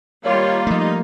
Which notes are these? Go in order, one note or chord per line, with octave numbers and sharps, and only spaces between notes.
D#2 D#3 G3 A#3 F4 C#5
F3 A3 D#4